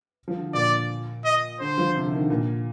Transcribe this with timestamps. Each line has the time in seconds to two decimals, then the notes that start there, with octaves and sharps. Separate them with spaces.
0.28 F3
0.37 D3
0.54 A#2 D5
1.25 D#5
1.60 D3 C5
1.78 F3
1.95 C3
2.04 D3
2.12 D#3
2.21 D3
2.30 A#2